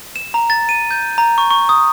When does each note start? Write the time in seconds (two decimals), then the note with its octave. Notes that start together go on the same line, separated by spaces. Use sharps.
0.16 E7
0.34 A#5
0.50 A6
0.69 D#7
0.91 G6
1.18 A#5
1.38 C#6
1.50 C#6
1.69 D#6